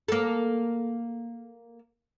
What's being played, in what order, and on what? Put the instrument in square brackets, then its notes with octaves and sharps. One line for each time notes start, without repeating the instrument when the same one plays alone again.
[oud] A#3 A4